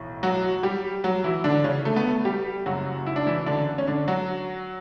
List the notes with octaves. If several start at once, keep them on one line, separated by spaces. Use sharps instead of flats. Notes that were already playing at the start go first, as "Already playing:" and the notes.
Already playing: B1 A2 E3
F#3 F#4
G3 G4
F#3 F#4
E3 E4
D3 D4
C#3 C#4
A3
B3
A3
G3 G4
F#1 F#2 C#3 F#3 F#4
E4
D4
E3 E4
D3 D4
C#4
D3 D4
F#3 F#4